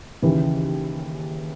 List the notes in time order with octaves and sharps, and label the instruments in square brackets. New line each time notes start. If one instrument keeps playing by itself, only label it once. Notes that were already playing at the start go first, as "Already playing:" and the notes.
[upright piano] D#2 C#3 E3